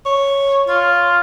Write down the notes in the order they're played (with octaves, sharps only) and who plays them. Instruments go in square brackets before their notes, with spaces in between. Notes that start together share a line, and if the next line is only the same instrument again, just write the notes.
[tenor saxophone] C#5
[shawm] F4 [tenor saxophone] C#5